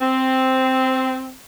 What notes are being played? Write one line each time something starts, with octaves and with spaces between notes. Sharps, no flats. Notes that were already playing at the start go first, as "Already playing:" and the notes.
C4